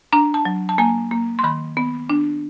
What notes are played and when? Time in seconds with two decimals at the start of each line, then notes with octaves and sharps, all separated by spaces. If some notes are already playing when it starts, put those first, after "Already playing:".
0.13 D4 A#5
0.34 A5
0.45 F#3
0.69 A5
0.78 A#3 G#5
1.11 A#3
1.39 C6
1.43 D#3 B5
1.77 B3
2.10 D4